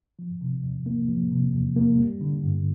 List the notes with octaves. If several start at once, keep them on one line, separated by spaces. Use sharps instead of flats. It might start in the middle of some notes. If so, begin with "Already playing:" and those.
F3
C3
E2
A#3
F3
C3
E2
A#3
G3
D3
G2